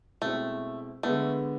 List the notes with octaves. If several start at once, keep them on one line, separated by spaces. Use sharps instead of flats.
B2 G#3 A3 C4 E4
D3 G#3 A3 B3 D4